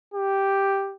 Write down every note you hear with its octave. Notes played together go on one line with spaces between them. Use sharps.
G4